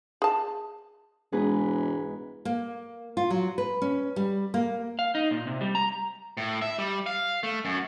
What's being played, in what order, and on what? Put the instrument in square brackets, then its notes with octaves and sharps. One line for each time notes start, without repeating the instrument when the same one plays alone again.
[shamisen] G#4 A5
[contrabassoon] E1 [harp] G#2 G#4 B4
[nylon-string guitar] A#3
F4
F#3
B4
C#4
G3
A#3
[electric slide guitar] F5
D#4
A#2
C3
G3
A#5
[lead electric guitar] A2
E5
G3
F5
A3
F#2